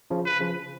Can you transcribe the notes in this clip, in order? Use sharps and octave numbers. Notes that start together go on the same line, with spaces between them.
C#3 F3
B4
C#3 F3